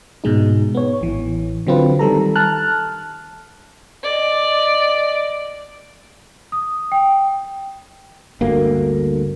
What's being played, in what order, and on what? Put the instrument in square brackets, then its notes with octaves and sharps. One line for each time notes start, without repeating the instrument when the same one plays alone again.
[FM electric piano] G#2 B2 G#3 D#4
B3 C#5
A1 E3
D3 F#3 C4 F4 B4
D#3 G3 A4 A#5
A5 F6 F#6
[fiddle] D5 D#5
[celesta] D#6
G5
[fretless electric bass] G1 D2 A#3